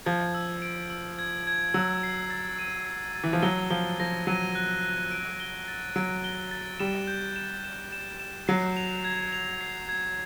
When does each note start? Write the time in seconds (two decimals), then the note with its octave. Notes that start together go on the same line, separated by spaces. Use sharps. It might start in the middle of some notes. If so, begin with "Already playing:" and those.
0.06 F3 G#6
0.34 E6
0.62 D7
0.90 E6
1.19 G#6
1.47 G#6
1.74 F#3 E6
2.03 C7
2.30 A6
2.59 D#7
2.87 C7
3.16 A6
3.24 E3
3.33 F3
3.42 F#3 G7
3.71 F3 G7
4.00 F3 A#6
4.27 F#3 D#7
4.55 F#6
4.83 F#6
5.11 D7
5.40 G7
5.68 A6
5.96 F#3 D7
6.24 G7
6.51 A6
6.80 G3 E7
7.07 G6
7.36 E7
7.64 E7
7.92 E7
8.20 E7
8.48 F#3 C7
8.77 F7
9.04 G#6
9.33 F7
9.61 C7
9.89 G#6